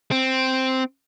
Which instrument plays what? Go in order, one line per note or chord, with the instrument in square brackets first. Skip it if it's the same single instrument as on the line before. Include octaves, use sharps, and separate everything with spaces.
[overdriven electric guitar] C4